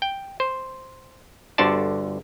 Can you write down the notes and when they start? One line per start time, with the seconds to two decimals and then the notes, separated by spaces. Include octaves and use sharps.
0.02 G5
0.40 C5
1.58 G1 D3 F#4 C5 D5 A5